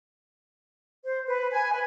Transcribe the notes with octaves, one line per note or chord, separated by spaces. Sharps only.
C5
B4
G#5
B4